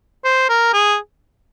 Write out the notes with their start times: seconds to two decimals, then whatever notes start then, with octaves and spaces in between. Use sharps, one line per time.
0.24 C5
0.49 A#4
0.74 G#4